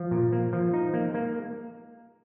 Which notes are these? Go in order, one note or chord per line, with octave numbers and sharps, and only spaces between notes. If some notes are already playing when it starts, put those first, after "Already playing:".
Already playing: F3
A#2
A#3
F3
D#4
A#3
A#3